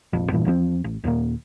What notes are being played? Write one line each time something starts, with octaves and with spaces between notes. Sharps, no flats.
F1 A#1 F2
E2 G2 A#2 E3
E2 F3 A#3 C4
A1
D#1 D#2 A#2 A#3